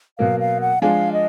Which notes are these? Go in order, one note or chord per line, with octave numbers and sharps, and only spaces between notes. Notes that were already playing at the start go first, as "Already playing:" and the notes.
B2 F#3 A#3 F5
F5
F#5
F3 G#3 D4 F4 G#4 F5
D#5